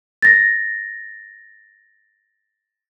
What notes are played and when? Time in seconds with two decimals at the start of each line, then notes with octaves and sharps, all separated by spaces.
0.22 A6 A#6